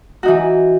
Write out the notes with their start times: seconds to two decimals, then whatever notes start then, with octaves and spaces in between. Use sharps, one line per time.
0.23 F#4
0.25 D#4
0.28 E3